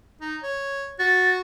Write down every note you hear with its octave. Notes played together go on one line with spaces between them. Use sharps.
D#4
C#5
F#4 A6